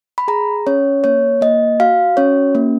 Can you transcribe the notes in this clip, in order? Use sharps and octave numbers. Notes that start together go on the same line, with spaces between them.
B5
G#4 A#5
C#4 C#5
A#3 C#5
A#3 D#5
F#4 F5
C#4 C#5
A#3